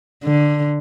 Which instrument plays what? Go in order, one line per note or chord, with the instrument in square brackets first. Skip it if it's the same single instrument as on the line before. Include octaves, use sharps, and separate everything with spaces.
[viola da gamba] D3